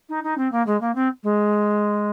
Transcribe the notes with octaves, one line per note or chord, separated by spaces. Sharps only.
D#4
D#4
C4
A#3
G#3
A#3
C4
G#3